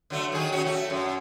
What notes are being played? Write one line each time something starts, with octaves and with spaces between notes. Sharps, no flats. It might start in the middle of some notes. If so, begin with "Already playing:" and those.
D3 F#3 A3
D#3 F#3 G#4
C#3 C#4 F#4
A3 F#4
F#2